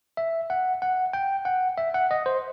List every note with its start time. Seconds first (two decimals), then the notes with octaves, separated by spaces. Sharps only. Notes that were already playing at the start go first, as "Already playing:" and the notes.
0.17 E5
0.50 F#5
0.82 F#5
1.13 G5
1.45 F#5
1.78 E5
1.94 F#5
2.11 D#5
2.26 C5